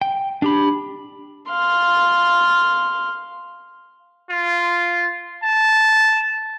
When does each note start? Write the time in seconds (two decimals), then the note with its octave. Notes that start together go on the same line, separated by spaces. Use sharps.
0.01 G5
0.42 D4 G4 B5
1.50 F5 C6
4.30 F4
5.43 A5